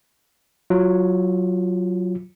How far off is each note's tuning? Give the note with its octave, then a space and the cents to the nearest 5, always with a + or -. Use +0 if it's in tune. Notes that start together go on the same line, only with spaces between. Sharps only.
F#3 +0 F4 +0